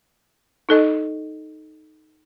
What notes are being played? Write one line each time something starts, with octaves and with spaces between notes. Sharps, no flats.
D#4 A4 D#5